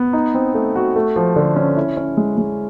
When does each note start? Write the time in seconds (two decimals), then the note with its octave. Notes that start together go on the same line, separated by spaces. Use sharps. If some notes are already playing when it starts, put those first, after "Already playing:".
Already playing: B3
0.13 D#4
0.34 C4
0.54 A3
0.75 F#4
0.96 A3
1.16 F3
1.36 D3
1.56 C#4
1.77 E4
1.97 C#4
2.17 G#3
2.38 G#3